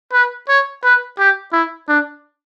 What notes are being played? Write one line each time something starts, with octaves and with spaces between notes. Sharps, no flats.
B4
C#5
B4
G4
E4
D4